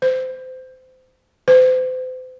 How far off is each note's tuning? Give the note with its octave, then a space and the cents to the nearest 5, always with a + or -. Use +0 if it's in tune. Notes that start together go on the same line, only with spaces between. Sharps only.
C5 -25
C5 -40